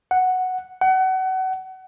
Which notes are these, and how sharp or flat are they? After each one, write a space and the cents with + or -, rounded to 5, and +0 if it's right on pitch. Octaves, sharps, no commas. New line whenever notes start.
F#5 +0
F#5 +30